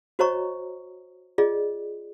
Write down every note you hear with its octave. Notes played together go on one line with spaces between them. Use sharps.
F#4 C5 C#5 D#5 A#5 C#6
F4 G#4 D5 D#5